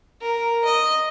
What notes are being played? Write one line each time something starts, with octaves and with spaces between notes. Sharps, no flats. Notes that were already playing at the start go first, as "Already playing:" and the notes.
A#4
D#5